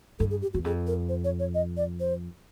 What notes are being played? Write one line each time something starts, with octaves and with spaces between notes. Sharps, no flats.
G2 A4
G#4
G4
E2 F#4
F2 G#4
A#4
C5
C#5
C#5
D#5
D5
C5